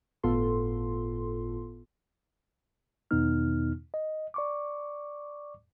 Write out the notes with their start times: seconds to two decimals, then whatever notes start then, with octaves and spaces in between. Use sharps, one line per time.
0.23 G1 A2 B3 F4 A4 C6
3.11 E2 B2 D#3 B3 D#4 F6
3.94 D#5
4.34 D5 C#6 D6